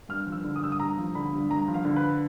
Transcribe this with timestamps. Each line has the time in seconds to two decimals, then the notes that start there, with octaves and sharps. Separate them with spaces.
0.09 G2 F6
0.27 F3
0.32 E6
0.44 D3
0.56 D#6
0.62 G2 E6
0.72 D#6
0.80 G2 A#5
0.97 F3
1.15 D3 B5
1.33 G2
1.50 G2 A#5
1.68 F3
1.74 F5
1.85 D3
1.96 B4